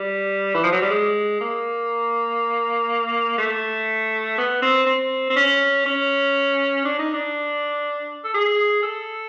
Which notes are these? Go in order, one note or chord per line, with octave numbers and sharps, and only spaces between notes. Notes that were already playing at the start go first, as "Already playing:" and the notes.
Already playing: G3
E3
F3
F#3
G3
G#3
A#3
A3
B3
C4
C4
C4
C#4
C#4
D4
D#4
D4
A4
G#4
A4